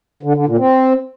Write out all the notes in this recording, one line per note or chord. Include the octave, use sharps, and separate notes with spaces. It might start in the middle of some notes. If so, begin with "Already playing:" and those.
D3
D3
A#2
C4